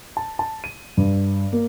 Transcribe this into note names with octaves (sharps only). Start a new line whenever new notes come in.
A5
A5
D#7
G2
A#3